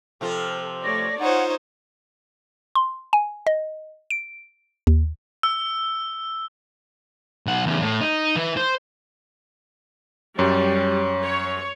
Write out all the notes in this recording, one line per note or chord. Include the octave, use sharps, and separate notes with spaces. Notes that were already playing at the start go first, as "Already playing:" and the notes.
C3 F3 F4 A4
A3 C#5 D5 A#6
D#4 F4 C5 C#5 F#5
C6
G#5
D#5
D7
D#2
E6
B1 F#5
E2 C#3
A2
D#4
E3
C5
F#2 G3 C#4
C#5